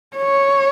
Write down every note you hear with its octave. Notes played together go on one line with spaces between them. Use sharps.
C#5